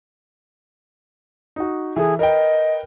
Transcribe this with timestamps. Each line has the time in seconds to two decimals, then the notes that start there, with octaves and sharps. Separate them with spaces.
1.56 D#4 F#4
1.96 E3 G#4 A4
2.19 A#4 B4 D#5 G5